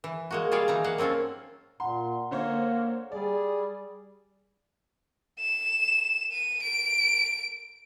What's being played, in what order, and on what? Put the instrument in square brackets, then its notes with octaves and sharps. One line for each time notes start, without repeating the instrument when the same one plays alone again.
[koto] E3
G#3 A#3 F#4
G3 F4 G#4 C#5 D5 F5
E3 D#4 A#5
A#3 F5 F#5
A#3 C4 C#4 F4 A4
[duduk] A#2 [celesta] F#5 A#5 [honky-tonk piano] C6
[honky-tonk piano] D3 C5 C#5 [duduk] A#3
[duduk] G3 [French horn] G#4 [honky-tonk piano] D5
[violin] E7
D#7
D7